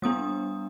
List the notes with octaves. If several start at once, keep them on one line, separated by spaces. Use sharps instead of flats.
G3 B3 D4 D#6